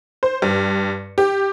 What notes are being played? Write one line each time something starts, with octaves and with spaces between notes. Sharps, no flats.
C5
G2
G4